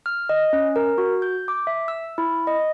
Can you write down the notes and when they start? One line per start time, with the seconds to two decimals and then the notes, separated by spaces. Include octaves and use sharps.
0.06 F6
0.29 D#5
0.53 C#4
0.76 A#4
0.98 F#4
1.22 G6
1.48 D6
1.67 E5
1.88 E6
2.18 E4
2.47 D#5